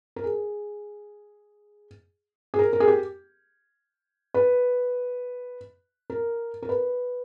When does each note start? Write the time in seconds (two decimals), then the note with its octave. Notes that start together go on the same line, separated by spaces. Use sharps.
0.16 A#4
0.24 G#4
2.54 G#4
2.59 A#4
2.73 A#4
2.80 G#4
2.88 G4
4.34 B4
6.10 A#4
6.63 A#4
6.69 B4